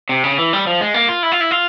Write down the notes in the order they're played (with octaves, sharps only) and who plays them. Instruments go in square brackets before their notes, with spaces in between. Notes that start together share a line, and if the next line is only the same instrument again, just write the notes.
[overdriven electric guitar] C3
C#3
E3
G3
F3
G#3
A#3
F4
E4
F4
E4
F4